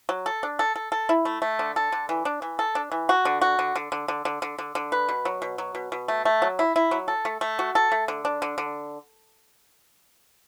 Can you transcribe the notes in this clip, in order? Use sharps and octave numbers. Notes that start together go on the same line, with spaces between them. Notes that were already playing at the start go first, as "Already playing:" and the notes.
F#3
A4
D4
A4
A4
A4
E4
A3
A3
D3
A4
D3
E3
D4
E3
A4
D4
E3
F#4
D3
F#4
D3
D3
D3
D3
D3
D3
D3
D3
B4
B2
F#3
B2
F#3
B2
B2
A3
A3
F#3
E4
E4
F#3
A4
A3
A3
F#4
A4
A3
D3
D4
D3
D3